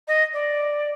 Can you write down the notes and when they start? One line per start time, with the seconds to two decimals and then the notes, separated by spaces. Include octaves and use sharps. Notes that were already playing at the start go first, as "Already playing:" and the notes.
0.08 D#5
0.33 D5